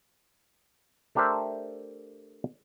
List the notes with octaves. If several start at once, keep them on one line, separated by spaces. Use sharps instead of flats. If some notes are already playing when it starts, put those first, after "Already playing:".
A3 D4 G4 A#4 C5 E5